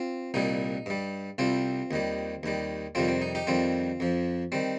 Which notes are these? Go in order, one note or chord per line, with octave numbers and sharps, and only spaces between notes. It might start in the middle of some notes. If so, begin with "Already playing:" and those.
Already playing: C4 F4
C2 A#2 G3 D#4
G2 G3
C2 C3 G3 C4 F4
D#2 D#3 G3
D#2 D#3 G3
F2 C3 D#3 G3 C4 F4
C4
D#4
D#4 G4
F2 D#3 G3 C4 F4
F2 F3
D#3 G3 C4